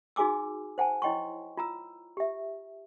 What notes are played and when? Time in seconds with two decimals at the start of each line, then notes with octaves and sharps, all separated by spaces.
0.16 D#4 F#4 G#4 G#5 D6 E6
0.78 C5 F#5 G#5 A5
1.02 E4 C#5 D#5 G5 C6 C#6
1.57 F4 A#5 E6
2.17 G4 E5